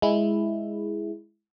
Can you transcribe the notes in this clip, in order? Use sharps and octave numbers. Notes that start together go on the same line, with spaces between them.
G#3 E4